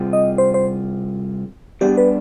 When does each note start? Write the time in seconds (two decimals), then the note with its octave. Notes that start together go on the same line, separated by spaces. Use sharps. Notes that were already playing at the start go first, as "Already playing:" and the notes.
Already playing: C3 G3 C4 F4 G#4
0.13 D#5
0.38 C5
0.54 C5
1.81 G3 B3 D4 G4 G#4 D5
1.97 B4